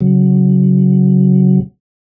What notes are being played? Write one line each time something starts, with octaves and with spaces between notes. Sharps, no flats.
C#3 F#3